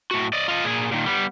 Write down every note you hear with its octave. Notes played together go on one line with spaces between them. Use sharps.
A2 F#4
D5 D#5
F4 D#5
A#2 G#4
A#2 D#3
G3 B3